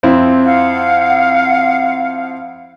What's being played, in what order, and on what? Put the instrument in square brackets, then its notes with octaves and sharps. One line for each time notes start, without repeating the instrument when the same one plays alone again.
[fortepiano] F2 C4 E4
[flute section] F5 F#5